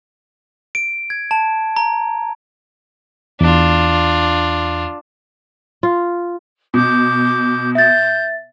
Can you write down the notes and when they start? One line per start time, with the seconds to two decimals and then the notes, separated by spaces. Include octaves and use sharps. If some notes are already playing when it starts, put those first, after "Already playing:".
0.75 D7
1.10 G#6
1.31 A5
1.76 A#5
3.41 E2 D4 F4
5.83 F4
6.74 B2 D6 G6
7.75 E5 G6 A6